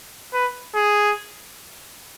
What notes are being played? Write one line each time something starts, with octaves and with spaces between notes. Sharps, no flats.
B4
G#4